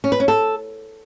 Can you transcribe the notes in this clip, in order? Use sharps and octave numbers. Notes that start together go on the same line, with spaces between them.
C#4
B4
C#4
A4